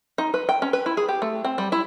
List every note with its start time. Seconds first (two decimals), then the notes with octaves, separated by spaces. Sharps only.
0.18 D#4
0.34 B4
0.49 G5
0.62 C#4
0.73 B4
0.86 E4
0.97 G#4
1.09 G4
1.22 A3
1.44 C4
1.58 G3
1.72 E4